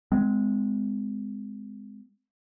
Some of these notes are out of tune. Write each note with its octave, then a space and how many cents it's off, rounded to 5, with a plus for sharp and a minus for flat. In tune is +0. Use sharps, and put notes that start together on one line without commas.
G#3 +0 C4 -30